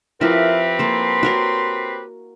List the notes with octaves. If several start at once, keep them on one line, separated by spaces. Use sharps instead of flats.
F3 C4 E4 G4 A#4 B4
A#3 A4 C6
F#4 A#4 C#5